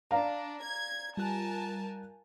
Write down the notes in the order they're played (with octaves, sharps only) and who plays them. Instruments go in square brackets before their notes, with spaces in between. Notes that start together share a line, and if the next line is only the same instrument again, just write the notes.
[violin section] D4 [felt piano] D5 F5 A#5
[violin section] G#6
[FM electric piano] G3 F4 F#6 [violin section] A#4 G#5 A5